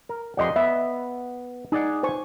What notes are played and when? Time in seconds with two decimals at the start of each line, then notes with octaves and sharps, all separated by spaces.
0.09 A#4
0.37 F2 G4 D5 D#5 F#5 C6
0.56 B3 E5
1.72 D#4 G#4 D5 F#5
2.03 C5 G#5 C#6